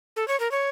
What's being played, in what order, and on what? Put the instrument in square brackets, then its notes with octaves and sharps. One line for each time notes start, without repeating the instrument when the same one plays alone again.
[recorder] A4
C#5
A#4
C#5